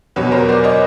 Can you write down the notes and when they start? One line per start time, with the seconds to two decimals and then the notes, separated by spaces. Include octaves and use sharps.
0.16 E2 B2 F#3 B4 C#5
0.32 A#4 C5
0.48 C5 D5
0.64 C#5 D#5